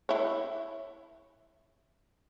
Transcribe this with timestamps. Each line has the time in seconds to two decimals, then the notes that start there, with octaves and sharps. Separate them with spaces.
0.09 E4 C#5